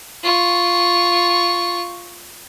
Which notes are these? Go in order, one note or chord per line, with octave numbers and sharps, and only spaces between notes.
F4 C#6